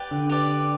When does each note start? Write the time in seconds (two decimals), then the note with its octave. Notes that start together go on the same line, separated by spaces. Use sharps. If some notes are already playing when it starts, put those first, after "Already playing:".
Already playing: G4 B4 D5
0.11 D3
0.29 G4 B4 D5